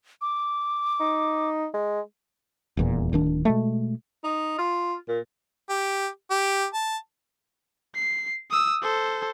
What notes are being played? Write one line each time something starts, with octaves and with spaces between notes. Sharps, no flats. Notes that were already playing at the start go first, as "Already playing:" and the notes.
D6
D#4
G#3
D#1 E2 A#2
D1 D#3 D4
B2 G#3 A3
D#4
F4
A#2
G4
G4
A5
C7
D#6 E6
A4 C5